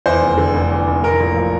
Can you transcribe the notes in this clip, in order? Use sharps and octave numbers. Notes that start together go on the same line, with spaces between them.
E2 C5
F1
D3
F1
E2
F1
A2 A#4
A#1
F3